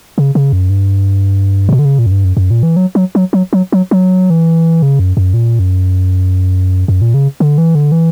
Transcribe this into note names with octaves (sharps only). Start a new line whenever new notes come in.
C#3
C#3
F#2
G2
A#2
B2
D3
C#3
A#2
F#2
G2
F#2
F#2
A#2
E3
F#3
F#3
F#3
F#3
F#3
F#3
F#3
E3
C#3
F#2
F#2
A#2
F#2
F#2
A#2
C#3
D3
E3
D3
E3